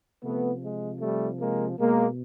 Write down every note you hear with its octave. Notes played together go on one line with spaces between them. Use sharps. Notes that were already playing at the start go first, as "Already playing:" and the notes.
C3 F3 A3 B3
G#3
G3 A3
G#3 A#3
B2 G#3 A#3